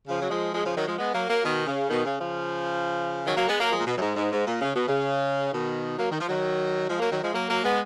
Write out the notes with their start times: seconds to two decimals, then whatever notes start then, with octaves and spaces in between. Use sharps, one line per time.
0.08 C#3 F3
0.21 F#3
0.30 F3 G#3
0.53 F3 G#3
0.64 C#3 F3
0.75 D#3 F#3
0.87 F3 G#3
0.99 G#3 B3
1.13 F#3 A#3
1.29 F#3 A#3
1.44 B2 D#3
1.66 C#3
1.89 B2 D#3
2.05 C#3
2.20 C#3 F3
3.25 D#3 F#3
3.36 F#3 A#3
3.48 G#3 B3
3.60 F#3 A#3
3.71 F3 G#3
3.80 A#2
3.86 B2
3.97 F#2
4.00 G#2
4.16 G#2
4.31 G#2
4.46 A#2
4.61 C#3
4.74 B2
4.88 C#3
5.52 B2 D#3
5.97 F#3 A#3
6.11 D#3
6.19 F3
6.28 D#3 F#3
6.89 F3 G#3
7.00 F#3 A#3
7.11 D#3 F#3
7.23 F3 G#3
7.34 F#3 A#3
7.49 F#3 A#3
7.64 G#3 B3